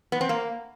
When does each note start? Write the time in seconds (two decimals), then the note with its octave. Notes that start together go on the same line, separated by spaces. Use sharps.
0.12 B3
0.21 C4
0.29 A#3